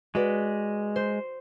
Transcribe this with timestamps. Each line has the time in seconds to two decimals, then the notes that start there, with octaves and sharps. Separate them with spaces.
0.15 G#3 F#4 B4 D5
0.96 C5